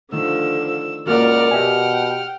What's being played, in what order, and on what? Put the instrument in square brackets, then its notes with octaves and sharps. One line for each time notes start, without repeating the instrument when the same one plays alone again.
[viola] D3 F3 [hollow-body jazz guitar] D#3 A3 [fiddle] E6
[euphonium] C#2 [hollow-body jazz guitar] A#3 F4 F#4 [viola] A#4 D5 [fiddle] F#5 F6
[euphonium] B2 [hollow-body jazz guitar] G4 E5 G#5 [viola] G5